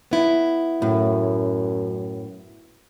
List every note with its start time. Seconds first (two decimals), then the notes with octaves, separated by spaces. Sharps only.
0.11 B3 E4
0.82 F#2 A2